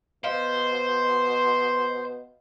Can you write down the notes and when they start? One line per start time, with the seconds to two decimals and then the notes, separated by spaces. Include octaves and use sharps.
0.24 B2 C5 D#5 F5